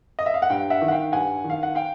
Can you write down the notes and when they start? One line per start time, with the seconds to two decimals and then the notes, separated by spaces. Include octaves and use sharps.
0.19 D#5
0.26 E5
0.34 F5
0.42 F#5
0.50 G2 F5 G5
0.70 E5 F#5
0.82 D#3
0.88 F#5
0.91 F5 G5
1.12 G2 F#5 G#5
1.44 D#3
1.50 F5
1.63 F#5
1.75 F5 G5